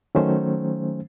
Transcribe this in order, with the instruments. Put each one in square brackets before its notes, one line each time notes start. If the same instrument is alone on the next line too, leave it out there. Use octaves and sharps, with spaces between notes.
[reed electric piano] D#3 F#3 A3 C#4 C5